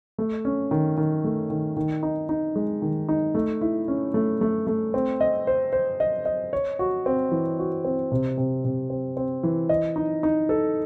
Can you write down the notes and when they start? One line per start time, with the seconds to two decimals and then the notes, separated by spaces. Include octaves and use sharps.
0.18 A3
0.45 C#4
0.71 D#3
0.97 D#3
1.24 A3
1.50 D#3
1.77 D#3
2.03 D#4
2.29 D#4
2.56 G#3
2.82 D#3
3.09 D#4
3.35 A3
3.61 E4
3.88 C#4
4.14 A3
4.41 A3
4.67 A3
4.94 C4
5.21 D#5
5.47 C5
5.73 C5
6.00 D#5
6.25 D#5
6.53 C#5
6.79 F#4
7.06 C4
7.31 E3
7.59 F#4
7.84 C4
8.12 C3
8.38 C3
8.64 C3
8.90 C4
9.17 C4
9.43 E3
9.69 D#5
9.96 D#4
10.23 D#4
10.49 A4